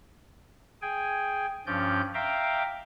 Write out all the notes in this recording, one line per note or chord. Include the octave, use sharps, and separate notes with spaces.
G#4 G5 G#5
G2 F3 C#4 D5 G6
E5 F5 G5 A#5 C6 D6